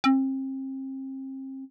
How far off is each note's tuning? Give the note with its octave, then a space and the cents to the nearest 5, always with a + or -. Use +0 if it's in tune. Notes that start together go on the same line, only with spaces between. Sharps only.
C4 +35